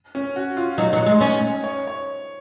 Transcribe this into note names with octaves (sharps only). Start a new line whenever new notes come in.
C#4
F#4
F4
F#3 D#4
F#3
G#3
C#4
C#5
C#5